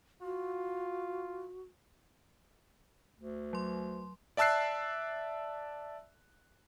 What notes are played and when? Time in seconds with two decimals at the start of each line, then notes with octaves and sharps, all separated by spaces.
0.22 F4 F#4
3.19 D2
3.53 F#3 C6
4.37 D5 E5 A5 E6 F#6 C7